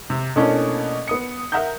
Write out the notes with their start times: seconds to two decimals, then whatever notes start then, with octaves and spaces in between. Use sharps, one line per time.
0.10 C3
0.36 B2 A3 A#3 C#4 D4 E4
1.08 B3 D#6 C#7
1.52 A#4 E5 F#5 A#5 D#6 G6